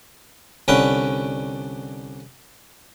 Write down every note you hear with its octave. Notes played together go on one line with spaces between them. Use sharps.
C2 D3 C#4 B4 G5